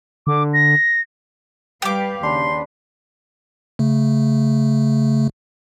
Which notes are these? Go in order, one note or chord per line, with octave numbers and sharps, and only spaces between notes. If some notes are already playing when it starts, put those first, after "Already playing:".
D3 D6
A#6
G3 G4 B4 F5 D6
D#2 C#3 D4 B4 C6
C#3 A3